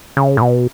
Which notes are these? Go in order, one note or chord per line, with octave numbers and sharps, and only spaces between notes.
C#3
A2
B2